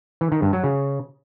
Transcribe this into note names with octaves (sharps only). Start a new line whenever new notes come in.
E3
D#3
G2
F#3
C#3